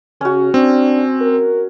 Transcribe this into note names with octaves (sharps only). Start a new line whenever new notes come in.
C#3 C#4 F#4
C4 D4
A#4